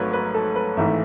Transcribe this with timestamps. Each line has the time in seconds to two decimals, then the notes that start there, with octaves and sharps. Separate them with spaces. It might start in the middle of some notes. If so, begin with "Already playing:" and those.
Already playing: G#1 G#2 F#3 A3 B4 C#5
0.13 B4
0.34 A4
0.56 B4
0.77 G#1 G#2 E3 A3 E5